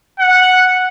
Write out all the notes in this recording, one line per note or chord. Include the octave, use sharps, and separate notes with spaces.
F#5